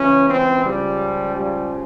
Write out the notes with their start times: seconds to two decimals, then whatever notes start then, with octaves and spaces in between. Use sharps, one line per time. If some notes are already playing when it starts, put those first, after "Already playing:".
Already playing: C#2 C#3 E3 C#4
0.28 C4
0.64 C#2 C#3 F3 G3
1.34 G3